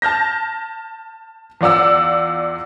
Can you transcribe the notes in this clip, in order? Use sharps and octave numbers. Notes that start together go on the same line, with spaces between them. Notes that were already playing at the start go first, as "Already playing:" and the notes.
A5 F6 G6 A#6
E2 F4 D5 F#5 E6